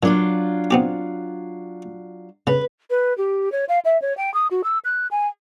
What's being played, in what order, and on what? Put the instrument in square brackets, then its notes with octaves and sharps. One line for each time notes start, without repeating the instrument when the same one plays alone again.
[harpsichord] A#2 [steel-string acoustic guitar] F#3 D4 F4
[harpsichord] B3 C4 G4
[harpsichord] C#3 [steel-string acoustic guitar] B4
[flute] B4
G4
C#5
F5
E5
C#5
G5
D#6
F#4
E6
F#6
G#5